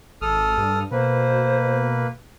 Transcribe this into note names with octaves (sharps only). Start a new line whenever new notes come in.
G#1 A4 D#6 F6
G2
B2 A#3 B4 C5